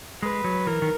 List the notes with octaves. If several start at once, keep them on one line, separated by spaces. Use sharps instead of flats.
G#3 B4
F#3
E3 A#4
D#3